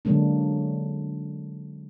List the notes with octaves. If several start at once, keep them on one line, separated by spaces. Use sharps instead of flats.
D3 F#3 G#3 A#3 D4